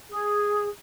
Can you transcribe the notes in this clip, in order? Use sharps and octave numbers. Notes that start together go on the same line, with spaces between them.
G#4